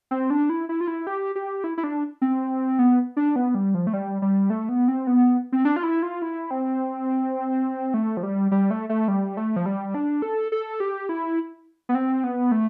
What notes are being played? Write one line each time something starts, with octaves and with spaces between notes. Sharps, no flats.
C4
D4
E4
E4
F4
E4
G4
G4
E4
E4
D4
C4
B3
D4
B3
G3
F3
A3
G3
G3
A3
B3
C4
B3
C4
D4
F4
E4
F4
E4
C4
A3
F3
G3
G3
A3
A3
G3
A3
F3
G3
D4
A4
A4
G4
E4
B3
C4
B3
A3